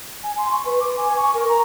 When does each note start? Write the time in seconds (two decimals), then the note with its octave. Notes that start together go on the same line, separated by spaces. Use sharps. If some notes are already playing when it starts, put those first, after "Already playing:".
0.24 G#5
0.38 C6
0.51 C#6
0.66 B4
0.80 D6
0.97 G#5
1.17 C#6
1.34 A#4
1.49 A#5